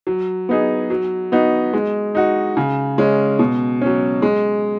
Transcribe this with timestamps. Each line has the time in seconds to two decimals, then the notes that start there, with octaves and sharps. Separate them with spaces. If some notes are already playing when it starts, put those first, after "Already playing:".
0.07 F#3
0.49 B3 D#4 G#4
0.90 F#3
1.32 B3 D#4 F#4
1.73 G#3
2.15 D#4 F#4
2.57 C#3
2.98 G#3 C#4
3.39 B2
3.81 F#3 C#4
4.22 G#3